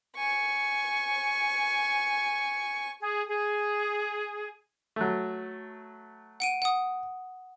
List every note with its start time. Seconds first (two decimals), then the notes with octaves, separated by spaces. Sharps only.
0.17 G#5 C#6
3.00 G#4
3.28 G#4
4.96 F#3 A3
6.40 F#5 D7 D#7
6.62 F#5 D#6